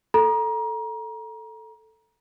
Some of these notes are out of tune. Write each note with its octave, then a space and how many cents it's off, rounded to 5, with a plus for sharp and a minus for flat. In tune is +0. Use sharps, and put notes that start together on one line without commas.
A4 +0 A#5 +30